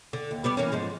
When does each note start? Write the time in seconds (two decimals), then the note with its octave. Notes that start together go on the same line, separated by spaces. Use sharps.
0.13 D3
0.31 D#2
0.44 G3 B3 D5
0.57 E3 A#3 C#4
0.72 G#2 F3 G#3